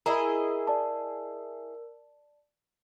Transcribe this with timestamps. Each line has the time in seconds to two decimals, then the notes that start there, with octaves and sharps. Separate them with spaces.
0.06 E4 G#4 A#4 D#5 A#5 B5
0.67 D5 A5